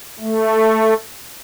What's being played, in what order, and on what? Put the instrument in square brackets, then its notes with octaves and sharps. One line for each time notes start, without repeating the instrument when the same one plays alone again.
[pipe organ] A3